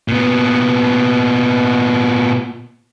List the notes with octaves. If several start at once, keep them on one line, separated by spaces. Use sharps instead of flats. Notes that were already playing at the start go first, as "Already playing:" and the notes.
A#2 B3